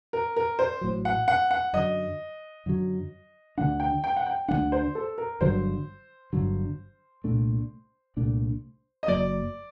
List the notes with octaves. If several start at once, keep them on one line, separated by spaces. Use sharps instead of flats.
A#4
A#4
C5
A1 A2 F#3
F#5
F#5
F#5
F#2 D3 F#3 D#5
F#2 D3 F#3
D2 D3 G3 D4 F#5
G5
G5
F#5
G5
D2 D3 G3 D4 F#5
C5
A4
A#4
G1 G2 D3 F#3 C5
G1 G2 D3 F#3
C2 A#2 A3 D4
C2 A#2 A3 D4
D#5
F#1 F#2 F#3 A#3 D5